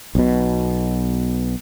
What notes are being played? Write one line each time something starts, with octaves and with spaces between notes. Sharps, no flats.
B1 B2